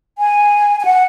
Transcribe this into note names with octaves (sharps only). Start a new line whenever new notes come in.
G#5
G#5
F#5